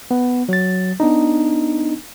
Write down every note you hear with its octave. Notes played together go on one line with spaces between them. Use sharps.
B3
F#3 A6
B3 D4 D#4